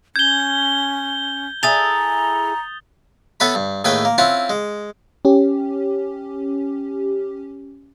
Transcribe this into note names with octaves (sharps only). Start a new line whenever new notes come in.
C#4 G6 G#6 G7
E4 G#4 A4 A#5 D#6 A6 F7
B3 A4 B4 C#5 E5 B5
G2
D#2 A2 G#4 B4 G5 G#5
A#3
C4 C#4 E4 F4 F#5
G#3
C#4 G4